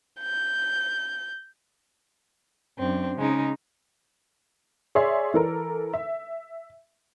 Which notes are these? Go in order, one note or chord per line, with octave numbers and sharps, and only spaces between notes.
G6
F#2 C4 D4
C#3 G#3 D#4
G#4 C#5 D5 E5 C6
E3 A4 A#4
E5